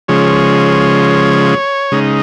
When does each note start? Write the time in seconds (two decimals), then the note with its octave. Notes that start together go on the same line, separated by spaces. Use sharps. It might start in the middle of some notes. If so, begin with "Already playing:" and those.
0.08 C#3 F3 G#3 C#5
1.92 C#3 G#3 D#4